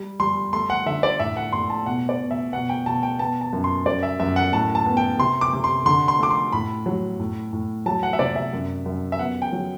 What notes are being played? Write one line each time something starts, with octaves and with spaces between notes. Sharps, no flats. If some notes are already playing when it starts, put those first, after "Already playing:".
Already playing: G3
G3 C6
A3 C6
F#5
D3 E5
D5
A2 E5
F#5
A2 C6
A5
B2 F#5
D5
B2
E5
B2 F#5
G5
B2 A5
G5
B3 A5
A5
F#2
C6
F#2 D5
E5
F#2 E5
F#5
A2 A5
A5
B3
G5
C3 C6
D6
C3
C6
D3 C6
C6
A3 D6
C6
A2 B5
F#3
A2
A2
F#3 A5
F#5
E5
C3 D5
E5
F#2
F#2
E5
B3 F#5
G5
F#3